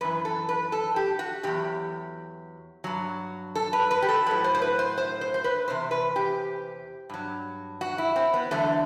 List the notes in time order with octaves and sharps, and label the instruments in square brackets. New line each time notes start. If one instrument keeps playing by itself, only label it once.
[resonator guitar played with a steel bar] F#2 E3 B4
A4
B4
A4
G4
F#4
B2 F#3 G4
E2
G2 F#3
A4
B4
B4
G4
A4
A2 F#3 B4
C5
C5
B4
C5
C5
C5
C5
B4
E2 C3 C5
B4
G4
G2 F#3
F#4
E4
C4
B3
E2 D3 F#3 A3